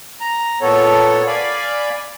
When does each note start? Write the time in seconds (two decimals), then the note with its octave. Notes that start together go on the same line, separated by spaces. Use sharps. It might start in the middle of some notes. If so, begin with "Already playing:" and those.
0.21 A#5
0.62 A#2 B3 A4 C#5
1.27 D5 F5 G#5 B5